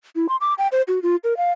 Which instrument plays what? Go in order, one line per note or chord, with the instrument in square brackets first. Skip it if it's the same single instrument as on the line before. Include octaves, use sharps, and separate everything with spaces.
[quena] E4
C6
D6
G5
C5
F#4
F4
A#4
F5